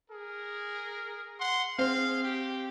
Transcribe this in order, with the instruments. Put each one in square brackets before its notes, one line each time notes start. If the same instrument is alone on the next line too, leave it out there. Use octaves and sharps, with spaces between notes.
[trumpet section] G#4 A#4
F#5 C6
[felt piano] C4 [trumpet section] G#4 F5
[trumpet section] G4